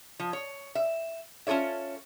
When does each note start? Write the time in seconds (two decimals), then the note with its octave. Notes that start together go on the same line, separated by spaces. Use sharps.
0.20 F3
0.33 C#5
0.75 E5
1.47 C#4 F4 A4 C#5 E5